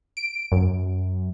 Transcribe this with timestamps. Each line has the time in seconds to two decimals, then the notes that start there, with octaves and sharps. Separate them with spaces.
0.17 D7
0.52 F#2